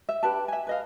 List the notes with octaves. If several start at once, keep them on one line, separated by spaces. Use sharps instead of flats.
E5
D4 G4 B4 A5
E5 G#5
B4 D#5 F5